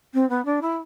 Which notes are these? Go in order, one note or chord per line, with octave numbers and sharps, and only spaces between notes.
C4
B3
D4
E4